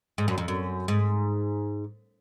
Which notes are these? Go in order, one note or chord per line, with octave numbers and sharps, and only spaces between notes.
G#2
F#2
F2
F#2
G#2